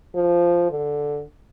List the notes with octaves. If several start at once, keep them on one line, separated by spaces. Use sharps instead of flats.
F3
D3